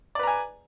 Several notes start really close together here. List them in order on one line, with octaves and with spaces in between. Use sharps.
D5 B4 A#5 G#5